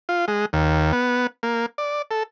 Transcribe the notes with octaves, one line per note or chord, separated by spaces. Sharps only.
F4
G#3
D#2
B3
A#3
D5
A4